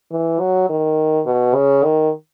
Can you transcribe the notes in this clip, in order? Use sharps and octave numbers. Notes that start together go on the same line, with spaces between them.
E3
F#3
D#3
B2
C#3
D#3